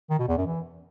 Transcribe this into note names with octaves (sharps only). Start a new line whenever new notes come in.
D#3
B2
E2
F#2
E3